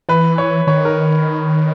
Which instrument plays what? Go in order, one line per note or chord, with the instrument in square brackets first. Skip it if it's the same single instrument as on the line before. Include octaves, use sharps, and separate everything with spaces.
[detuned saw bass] E3 [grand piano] B4
[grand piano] C#5
[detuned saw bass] D#3 [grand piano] C#5
[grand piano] A#4